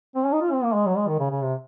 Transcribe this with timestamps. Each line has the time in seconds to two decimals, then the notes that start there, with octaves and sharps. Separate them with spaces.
0.16 C4
0.25 C#4
0.33 D#4
0.41 F4
0.52 C4
0.63 A#3
0.74 G#3
0.86 F#3
0.97 G#3
1.08 D#3
1.20 C#3
1.31 C#3
1.42 C3